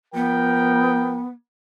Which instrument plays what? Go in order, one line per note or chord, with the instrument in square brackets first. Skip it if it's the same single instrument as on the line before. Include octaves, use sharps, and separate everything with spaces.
[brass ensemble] F3 A#4 G5 [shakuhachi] B3